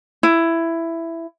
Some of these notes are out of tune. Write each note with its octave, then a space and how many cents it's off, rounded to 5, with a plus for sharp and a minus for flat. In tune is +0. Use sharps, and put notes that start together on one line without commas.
E4 +10